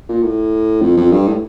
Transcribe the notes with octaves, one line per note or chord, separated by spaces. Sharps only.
A#2
A2
F2
F2
G2
A2